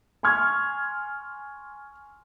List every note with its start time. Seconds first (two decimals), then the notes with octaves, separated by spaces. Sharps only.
0.23 G#5 C6 C#6 F6 G#6